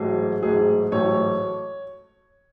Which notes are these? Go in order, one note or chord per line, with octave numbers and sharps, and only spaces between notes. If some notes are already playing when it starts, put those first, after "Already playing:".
Already playing: A1 G#2 F#3 A3 G#4
A1 G#2 F#3 A3 G#4
A1 G#2 F#3 A3 C#5